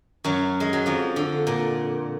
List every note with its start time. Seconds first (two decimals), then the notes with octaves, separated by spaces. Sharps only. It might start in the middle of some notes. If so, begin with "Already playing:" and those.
0.24 F#2 F#3
0.60 G#3
0.73 F#3
0.86 F2 F3
1.16 D3
1.47 A#2